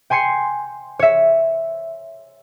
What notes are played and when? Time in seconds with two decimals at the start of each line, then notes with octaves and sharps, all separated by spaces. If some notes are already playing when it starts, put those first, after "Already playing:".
0.10 G5 G#5 C6 C7 C#7
0.99 C#5 E5